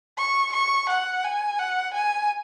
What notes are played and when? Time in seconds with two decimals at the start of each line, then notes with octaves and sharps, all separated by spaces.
0.18 C#6
0.53 C#6
0.89 F#5
1.24 G#5
1.59 F#5
1.94 G#5